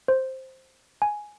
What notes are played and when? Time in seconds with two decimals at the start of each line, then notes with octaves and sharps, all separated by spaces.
0.08 C5
1.02 G#5